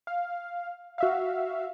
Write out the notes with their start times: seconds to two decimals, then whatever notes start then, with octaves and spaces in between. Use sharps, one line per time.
0.07 F5
0.98 F#4 E5 F5